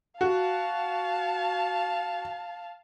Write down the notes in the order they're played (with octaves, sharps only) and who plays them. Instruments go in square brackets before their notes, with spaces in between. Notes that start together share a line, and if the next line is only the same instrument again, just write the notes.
[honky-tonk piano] F#4 [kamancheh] F5 A5